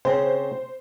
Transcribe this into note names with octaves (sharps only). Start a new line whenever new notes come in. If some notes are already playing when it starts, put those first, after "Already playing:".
C#3 C4 C#4 C5